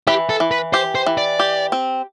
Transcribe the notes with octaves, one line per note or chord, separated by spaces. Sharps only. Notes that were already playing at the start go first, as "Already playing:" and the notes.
E3 G4
A4
E3
B4
G4 C5
C5
E3
D5
G4
C4